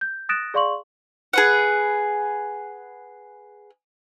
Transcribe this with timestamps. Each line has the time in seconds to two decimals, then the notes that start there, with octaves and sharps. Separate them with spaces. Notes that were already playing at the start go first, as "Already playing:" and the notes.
0.01 G6
0.29 D#6 F#6 A6 A#6 D7 E7
0.54 G#4 D5 F5 C6 C#6 F#7
1.33 G#4 B4 F#5